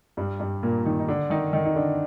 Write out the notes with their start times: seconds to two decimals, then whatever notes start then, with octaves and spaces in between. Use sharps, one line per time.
0.17 G2 G3
0.40 G2 G3
0.63 A#2 A#3
0.85 D#3 D#4
0.99 D#4
1.08 D3 D4
1.30 D#3 D#4
1.53 D#3 D#4
1.65 D#4
1.76 D3 D4